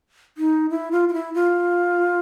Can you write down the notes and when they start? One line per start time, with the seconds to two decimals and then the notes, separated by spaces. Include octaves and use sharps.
0.37 D#4
0.70 E4
0.92 F4
1.09 F4
1.13 E4
1.34 F4